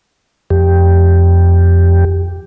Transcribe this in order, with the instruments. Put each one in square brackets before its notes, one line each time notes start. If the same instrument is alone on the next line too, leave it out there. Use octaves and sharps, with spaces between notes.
[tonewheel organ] F2 G4